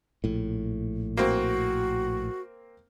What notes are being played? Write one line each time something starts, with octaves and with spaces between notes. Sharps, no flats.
A#1 A2
A#3 C4 F#4